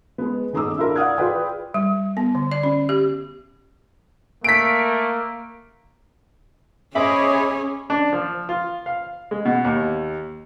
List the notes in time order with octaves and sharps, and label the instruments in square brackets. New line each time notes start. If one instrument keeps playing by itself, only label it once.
[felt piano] G#3 B3
D#1 D#4 G#4 A#5 D6 E6
D4 E4 F4 A#4
D5 F5 F#5 D#6 F6 G#6
F4 G#4 B4 D5 G5
[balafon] G3
B3
D3
D5
C#4
G4
[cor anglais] A3 [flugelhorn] A#3 [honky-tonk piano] B6 D7
[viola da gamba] C#4 [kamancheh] G#4 C#5 [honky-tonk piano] C5 D#5 E5 [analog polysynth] B5 D6
[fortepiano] D4
F3
F4
F5
G#3
B2
D#2